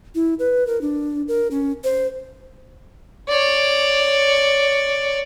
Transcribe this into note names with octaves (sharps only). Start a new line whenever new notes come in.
E4
B4
A#4
D4
A#4
C#4
C5
C#5 D5